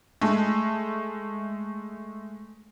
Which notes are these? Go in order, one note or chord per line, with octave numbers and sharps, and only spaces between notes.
G#3 A3